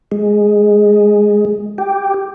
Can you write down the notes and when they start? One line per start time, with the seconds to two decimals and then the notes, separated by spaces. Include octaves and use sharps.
0.12 G#3
1.78 G4